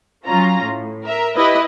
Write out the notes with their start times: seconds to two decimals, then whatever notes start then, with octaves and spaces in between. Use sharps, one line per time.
0.25 F#3 C#4 F4 A#5
0.61 A2
1.04 A#4 E5
1.36 E4 G4 B4 D#5 B5